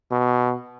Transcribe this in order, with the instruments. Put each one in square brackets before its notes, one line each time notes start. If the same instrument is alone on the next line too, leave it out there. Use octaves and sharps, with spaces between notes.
[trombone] B2